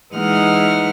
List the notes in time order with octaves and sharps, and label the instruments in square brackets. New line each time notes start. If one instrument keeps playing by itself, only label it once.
[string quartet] E3 G#3 D#4 F#5 F6